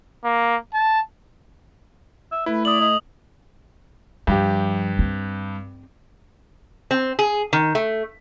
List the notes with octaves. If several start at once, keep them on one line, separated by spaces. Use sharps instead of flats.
A#3
A5
E5
A3 E4 B4
D5 D#6 F#7
D#5
G2 F3 G4
C4
C4
G#4
D#3
A3